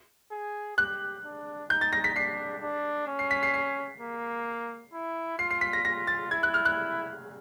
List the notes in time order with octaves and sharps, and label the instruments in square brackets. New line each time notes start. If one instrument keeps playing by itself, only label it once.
[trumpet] G#4
[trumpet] G4 [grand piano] F#6
[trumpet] D4
[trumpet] D#4 [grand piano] G6
[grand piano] A6
A#6
B6
[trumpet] D4 [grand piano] C7
[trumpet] D4
C#4
[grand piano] C7
B6
C7
C7
[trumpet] A#3
E4
[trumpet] F4 [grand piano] C7
[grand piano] C7
B6
A#6
[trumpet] F4 [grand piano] A#6
[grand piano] A6
[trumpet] E4 [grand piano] G#6
[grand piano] F#6
F6
F#6